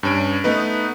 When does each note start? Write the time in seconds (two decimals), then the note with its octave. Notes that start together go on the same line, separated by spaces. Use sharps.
0.03 G2 C#4 D7
0.44 A3 B3 D#4 B4